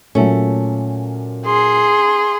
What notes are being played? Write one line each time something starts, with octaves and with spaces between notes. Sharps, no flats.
A#2 F#3 A3 C#4
G#4 C6